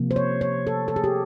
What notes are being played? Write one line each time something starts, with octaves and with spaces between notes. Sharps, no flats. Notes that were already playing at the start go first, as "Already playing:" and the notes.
Already playing: C3 F3 A#3
C5
C#5
C#5
A4
A4
G#4
G4